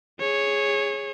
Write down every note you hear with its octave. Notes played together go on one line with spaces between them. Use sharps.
G#4 C#5